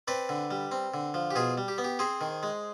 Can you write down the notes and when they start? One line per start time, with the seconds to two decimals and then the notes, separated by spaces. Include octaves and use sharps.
0.08 C4 B4 D5
0.29 D3
0.51 G3
0.72 C4
0.94 D3
1.14 F3
1.31 G4
1.35 B2 F4 G#4
1.58 G3
1.68 G4
1.78 B3
1.84 G4
1.99 C4 G#4 C5
2.21 D#3
2.43 G#3